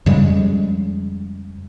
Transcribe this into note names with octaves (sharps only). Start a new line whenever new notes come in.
F2 C#3 G3 G#3